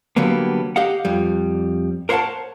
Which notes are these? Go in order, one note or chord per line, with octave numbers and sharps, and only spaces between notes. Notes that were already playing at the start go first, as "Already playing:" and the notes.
D3 F#3 G3 A#3 B3
G4 D#5 F5 F#5
F2 G3
A#4 C5 C#5 F5 F#5 A5